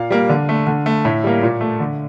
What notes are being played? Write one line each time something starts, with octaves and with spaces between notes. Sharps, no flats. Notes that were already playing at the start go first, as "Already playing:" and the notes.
Already playing: A#2 F5
G3 A#3
D3
A3
D3
A3
A2 E5
G3 A#3
A#2
A3
D3